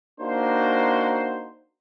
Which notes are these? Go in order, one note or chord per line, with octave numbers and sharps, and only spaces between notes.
A#3 D4 D#4 F#4 C5